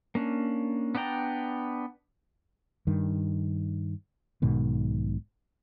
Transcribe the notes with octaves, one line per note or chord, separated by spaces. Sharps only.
A#3 C#4 D4
B3 D4 D5 G5 A#5
G2 D#3
B1 G#2 B2 D#3